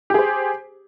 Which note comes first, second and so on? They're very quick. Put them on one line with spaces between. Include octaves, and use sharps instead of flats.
G4 G#4 C5